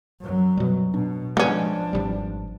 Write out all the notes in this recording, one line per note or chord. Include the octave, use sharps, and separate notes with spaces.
F#2 F#3
B2 G3
B2 D4
F3 G#3 B3 C#4 D4
G#1 D#2 G3